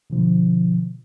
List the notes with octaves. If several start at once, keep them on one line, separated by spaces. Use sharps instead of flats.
B2 D3 F3